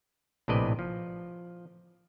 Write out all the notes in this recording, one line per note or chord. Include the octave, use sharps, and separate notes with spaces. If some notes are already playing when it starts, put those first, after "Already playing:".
A#1 A2 C3 B4 D5 D#5
F3